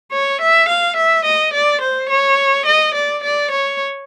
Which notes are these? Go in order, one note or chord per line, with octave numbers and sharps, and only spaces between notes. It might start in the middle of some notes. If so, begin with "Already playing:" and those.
C#5
E5
F5
E5
D#5
D5
C5
C#5
D#5
D5
D5
C#5